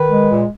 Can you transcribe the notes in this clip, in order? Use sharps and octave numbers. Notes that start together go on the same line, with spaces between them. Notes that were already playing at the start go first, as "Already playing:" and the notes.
Already playing: D#3 B4
G#3
A#2